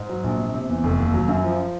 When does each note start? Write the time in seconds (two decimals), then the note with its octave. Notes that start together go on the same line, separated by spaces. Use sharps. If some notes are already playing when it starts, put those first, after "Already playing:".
Already playing: G#2
0.09 F#3
0.24 A#1
0.39 C3
0.54 C3
0.69 E2
0.84 F1
0.99 D#2
1.14 F#3
1.28 F#2
1.44 F3